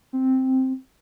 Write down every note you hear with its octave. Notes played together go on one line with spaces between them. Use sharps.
C4